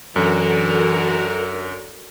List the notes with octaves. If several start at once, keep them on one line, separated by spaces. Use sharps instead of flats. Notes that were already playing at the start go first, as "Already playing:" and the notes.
F#2 D3 E3 F#4 A4 A#4